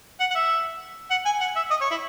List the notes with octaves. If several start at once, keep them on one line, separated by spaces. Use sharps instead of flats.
F#5
F#5
E5
F#5
G#5
F#5
E5
D#5
C#5
E4